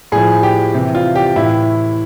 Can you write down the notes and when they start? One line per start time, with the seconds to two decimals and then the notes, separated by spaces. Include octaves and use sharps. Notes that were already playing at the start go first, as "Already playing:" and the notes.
0.12 A2 F3 G#4
0.43 G4
0.74 C3 E3
0.95 F4
1.15 G4
1.36 A2 E3 E4